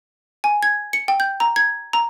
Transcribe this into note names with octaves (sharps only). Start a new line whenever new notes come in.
G#5
G#6
C#7
G5
G6
A#5
G#6
A#5